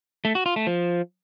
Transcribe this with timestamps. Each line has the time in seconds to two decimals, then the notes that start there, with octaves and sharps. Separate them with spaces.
0.25 A3
0.35 F#4
0.46 F4
0.56 A3
0.67 F3